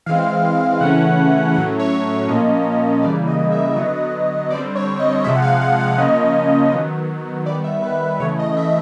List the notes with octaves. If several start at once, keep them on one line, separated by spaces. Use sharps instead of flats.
E3 G#3 C4 F5
C#3 E3 A3 C#4 F#5
A2 F#3 A3 C#4 F#5
C#5
C#5
A#2 F3 A#3 C#4 D#5
C#3 E3 G3 A#3 D5
D#5
E5
D3 F#3 B3 D#5
D3 G3 C4 D5
C#5
D#5
C3 F3 G#3 E5
F#5
F5
F#5
F5
C#3 F3 A#3 C#4 D#5
D#3 F#3 B3
D#3 G3 B3 D5
E5
B4
C#3 E3 A3 C#5
D#5
E5